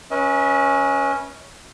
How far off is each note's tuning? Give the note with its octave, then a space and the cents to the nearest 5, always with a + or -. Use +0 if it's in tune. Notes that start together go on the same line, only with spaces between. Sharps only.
C#4 +0 B4 -30 D#5 +45